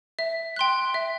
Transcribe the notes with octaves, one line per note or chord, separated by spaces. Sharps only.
E5
G5 C6 F#6
E5